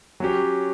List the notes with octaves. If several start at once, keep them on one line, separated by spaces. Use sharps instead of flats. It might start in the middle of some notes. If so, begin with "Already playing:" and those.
F#3 C#4 G4